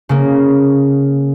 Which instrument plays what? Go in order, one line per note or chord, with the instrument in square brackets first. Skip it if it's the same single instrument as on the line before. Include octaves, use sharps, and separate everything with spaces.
[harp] C#3 A#3